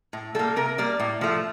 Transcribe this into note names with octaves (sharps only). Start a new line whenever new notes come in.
A2
G3 A#3 A4
C3 A#4
G3 A#3 D5
A2
F3 A3